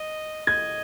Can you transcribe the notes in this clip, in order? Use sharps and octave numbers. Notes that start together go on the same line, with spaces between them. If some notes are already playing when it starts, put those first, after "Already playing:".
Already playing: D#5
D#5 G#6